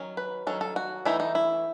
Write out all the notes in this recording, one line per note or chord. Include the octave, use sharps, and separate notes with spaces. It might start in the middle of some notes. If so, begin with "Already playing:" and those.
Already playing: D#3 F#3 C#4
B4
D#3 F#3 C#4 A4
A4
F#4
E3 A3 D#4 E4
D#4
E4